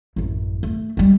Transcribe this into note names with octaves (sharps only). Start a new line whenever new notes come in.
A1 F#2
A3
G3 G#3